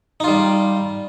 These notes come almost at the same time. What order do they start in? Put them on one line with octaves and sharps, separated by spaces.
D#4 F4 G3